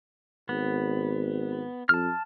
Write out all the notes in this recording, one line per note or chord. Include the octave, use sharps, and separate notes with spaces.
G#1 B3
F2 A5 F6